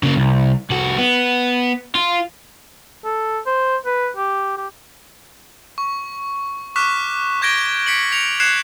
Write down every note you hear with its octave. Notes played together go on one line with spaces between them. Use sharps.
C#3 A#3
C2
C2 F#4
B3
F4
A4
C5
B4
G4
G4
C#6
C#6 D6 F6 F#6 B6 E7
C#6 G6 G#6 A#6 D7 G7
B6 C#7 D7 F#7
A#6 C#7 F7
F#6 G#6 C7 C#7 E7